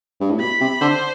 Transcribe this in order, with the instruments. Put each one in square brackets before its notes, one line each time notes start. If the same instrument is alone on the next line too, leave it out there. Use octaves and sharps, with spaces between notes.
[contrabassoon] G2
A2
[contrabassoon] B2 [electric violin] B5
[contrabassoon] C3
[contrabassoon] D3 [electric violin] C5